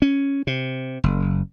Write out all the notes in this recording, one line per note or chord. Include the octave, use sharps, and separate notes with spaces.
C#4
C3
F#1